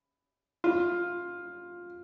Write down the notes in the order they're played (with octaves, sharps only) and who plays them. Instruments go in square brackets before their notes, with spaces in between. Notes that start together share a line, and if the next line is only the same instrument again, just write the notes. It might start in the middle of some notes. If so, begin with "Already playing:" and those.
[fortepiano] F4